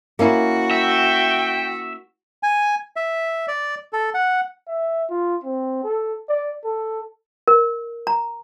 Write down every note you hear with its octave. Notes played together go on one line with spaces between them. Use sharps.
A#3 C#4 E4 F#4
E5 G5
G#5
E5
D5
A4
F#5
E5
F4
C4
A4
D5
A4
A#4
A#5